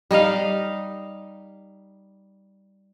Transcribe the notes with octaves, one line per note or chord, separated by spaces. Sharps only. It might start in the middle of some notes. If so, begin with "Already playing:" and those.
G3 D#4 D#5 F5